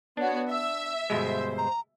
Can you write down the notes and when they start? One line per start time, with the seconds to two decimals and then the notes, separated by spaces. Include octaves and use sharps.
0.17 B3 D4 F#4 C#5
0.50 E5 E6
1.10 G1 B2 G#3 C5
1.58 A#5